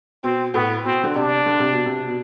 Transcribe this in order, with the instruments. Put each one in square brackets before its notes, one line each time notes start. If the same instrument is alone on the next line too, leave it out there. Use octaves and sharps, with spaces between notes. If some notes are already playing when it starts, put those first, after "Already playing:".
[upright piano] B2 [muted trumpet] C4
[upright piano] A2 [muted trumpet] B3
[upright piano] B2 [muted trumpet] C4
[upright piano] D3
[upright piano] C3 [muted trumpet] D4
[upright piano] D3
C3
B2
C3
B2